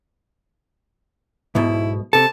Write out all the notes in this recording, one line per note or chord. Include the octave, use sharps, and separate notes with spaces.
B1 G#2 B2 E4
C3 A4 A5